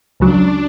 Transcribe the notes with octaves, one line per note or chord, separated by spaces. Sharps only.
C#2 C#3 F#3 D4